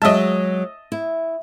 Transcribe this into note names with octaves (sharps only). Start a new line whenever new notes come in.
F#3 G#3 D#5 E5 A5
E4